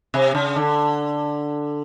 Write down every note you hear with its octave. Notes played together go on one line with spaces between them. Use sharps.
C3
C#3
D3